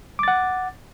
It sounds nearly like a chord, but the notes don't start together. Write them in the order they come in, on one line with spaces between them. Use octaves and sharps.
D6 A6 F#5